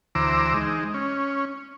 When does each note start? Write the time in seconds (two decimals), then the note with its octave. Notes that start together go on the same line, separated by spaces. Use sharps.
0.15 D2 E3 C5 A#5 D6 E6
0.54 G#3 D#4
0.94 C#4